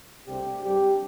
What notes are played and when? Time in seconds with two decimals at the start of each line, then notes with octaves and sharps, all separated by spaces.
0.27 C2 C3 A3 C4 D4 G4
0.63 G2 G3 C4 D4 G4